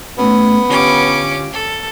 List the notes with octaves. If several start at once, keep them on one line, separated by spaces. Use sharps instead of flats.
A2 A3 B3 C#4
D3 C#4 F4 G4 D6
A4